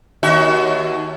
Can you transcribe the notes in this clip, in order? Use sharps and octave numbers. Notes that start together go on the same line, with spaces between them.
D#2 F#4 E5